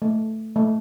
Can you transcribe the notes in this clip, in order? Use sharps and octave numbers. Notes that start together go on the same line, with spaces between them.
A3
A3